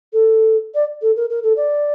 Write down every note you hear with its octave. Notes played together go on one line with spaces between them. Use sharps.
A4
D5
A4
A#4
A#4
A4
D5